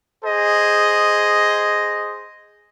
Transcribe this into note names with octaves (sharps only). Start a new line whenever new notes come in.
G#4 C5 D#5